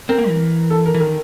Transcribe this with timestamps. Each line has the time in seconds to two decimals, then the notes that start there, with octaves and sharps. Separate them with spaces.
0.09 C4 A#4
0.18 A#3
0.29 E3
0.70 A4
0.86 A#4
0.94 E3
1.01 D#3 A#4